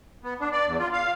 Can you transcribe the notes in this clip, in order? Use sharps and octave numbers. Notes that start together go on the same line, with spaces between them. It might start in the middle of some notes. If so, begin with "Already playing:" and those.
B3
D4
D5
E2
F4
F5